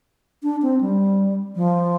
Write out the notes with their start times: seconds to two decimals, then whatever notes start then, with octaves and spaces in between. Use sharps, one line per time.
0.43 D4
0.62 C4
0.81 G3
1.56 F3